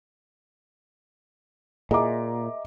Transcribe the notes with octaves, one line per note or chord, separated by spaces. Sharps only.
A#2 G#4 D#5 E5 A#5 D6